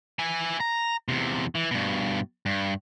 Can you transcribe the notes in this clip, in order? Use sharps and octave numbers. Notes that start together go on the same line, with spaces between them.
E4 G#5
A#5
E2 C3
E3
G2 B2
G2